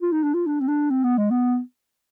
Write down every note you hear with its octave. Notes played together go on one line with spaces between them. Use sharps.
F4
D#4
D4
F4
D4
C4
D4
C4
B3
G#3
B3